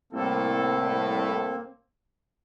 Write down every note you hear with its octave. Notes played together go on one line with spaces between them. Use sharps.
C2 A2 A#3 C4 A4